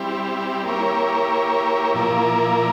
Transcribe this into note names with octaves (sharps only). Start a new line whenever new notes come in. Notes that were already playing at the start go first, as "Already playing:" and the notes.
Already playing: G3 C4 E4 G4
A#3 E4 G4 A#4 C#5
A#2 F3 A#3 E4 A#4